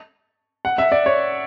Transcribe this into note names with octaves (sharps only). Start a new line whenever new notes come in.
F#5
E5
D5
C#5